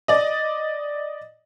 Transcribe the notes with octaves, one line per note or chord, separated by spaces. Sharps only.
D5 D#5